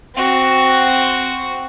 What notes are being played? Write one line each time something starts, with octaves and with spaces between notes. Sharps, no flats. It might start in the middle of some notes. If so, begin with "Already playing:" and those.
C4 F#4